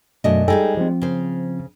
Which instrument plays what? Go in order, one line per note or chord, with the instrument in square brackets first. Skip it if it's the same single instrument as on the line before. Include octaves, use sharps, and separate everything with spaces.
[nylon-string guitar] F#2 D4 D#5 [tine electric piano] B2 A3
[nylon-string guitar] G3 G#3 D#4 [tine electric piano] A4 G5 G#5
[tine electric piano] F3 C4
[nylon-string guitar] C#3 C5